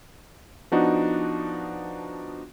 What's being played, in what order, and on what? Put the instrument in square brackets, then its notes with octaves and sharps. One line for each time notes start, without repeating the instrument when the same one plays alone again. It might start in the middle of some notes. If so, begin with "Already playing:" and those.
[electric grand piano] F3 B3 D4 D#4 F#4